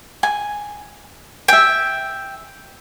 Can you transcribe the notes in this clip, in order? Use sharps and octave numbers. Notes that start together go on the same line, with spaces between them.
G#5
E5 G5 G#5